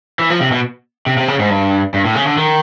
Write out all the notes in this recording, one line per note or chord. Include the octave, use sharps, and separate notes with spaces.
E3
F3
C3
B2
C3
C3
C#3
G#2
G2
G2
A2
C#3
D3
D#3